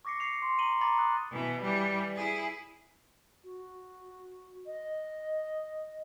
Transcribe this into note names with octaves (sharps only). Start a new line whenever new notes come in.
C#6 D6 A#6 C7 C#7
C7 C#7 F7
C6
A#5 D#7 F#7 G7
A#5 B5 D6 A6 C#7 F#7
D#6 F#6
B2 E3
E3 G3
E4 G#4
F#4
D#5